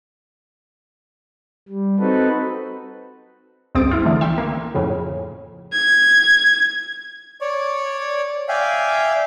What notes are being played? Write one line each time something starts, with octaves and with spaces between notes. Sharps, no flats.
G3
C4 D#4 F#4 A4 B4
G1 C#2 C4 D#6 A6 D7
E4 F4
D3 E3 A3
E5 G5 C6
A#3
F2 A2 C#3
G#6
C#5 D5
D5 E5 F5 G5 G#5